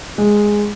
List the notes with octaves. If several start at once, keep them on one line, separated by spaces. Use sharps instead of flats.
G#3